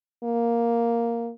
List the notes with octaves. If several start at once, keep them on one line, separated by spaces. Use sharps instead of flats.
A#3